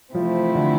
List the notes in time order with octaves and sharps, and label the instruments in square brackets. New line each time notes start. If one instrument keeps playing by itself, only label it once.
[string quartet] C3 E3 A3 C4 E4 [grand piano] F3
[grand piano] D3